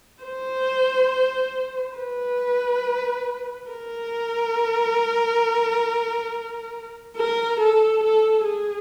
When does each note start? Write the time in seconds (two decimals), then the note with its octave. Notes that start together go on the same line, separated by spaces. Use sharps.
0.24 C5
1.97 B4
3.70 A#4
7.16 A#4
7.60 A4
8.03 A4
8.47 G#4